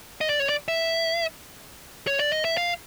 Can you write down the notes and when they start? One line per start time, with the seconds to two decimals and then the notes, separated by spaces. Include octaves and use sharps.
0.21 D#5
0.29 D5
0.40 C#5
0.48 D5
0.68 E5
2.07 C#5
2.19 D5
2.33 D#5
2.45 E5
2.57 F5